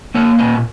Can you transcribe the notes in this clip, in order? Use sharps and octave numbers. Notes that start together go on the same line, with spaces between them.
A#3 C#5
A#2 D#5